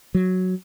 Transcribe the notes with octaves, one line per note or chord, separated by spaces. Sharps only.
F#3